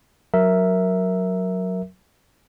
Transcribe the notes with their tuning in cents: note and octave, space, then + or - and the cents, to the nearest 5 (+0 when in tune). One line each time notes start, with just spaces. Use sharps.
F#3 -5 A#4 +0 E5 +0